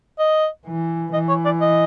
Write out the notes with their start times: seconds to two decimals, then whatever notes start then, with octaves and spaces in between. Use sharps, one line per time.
0.19 D#5
0.66 E3
1.13 E3 D#5
1.29 C#5
1.45 D5
1.61 D#5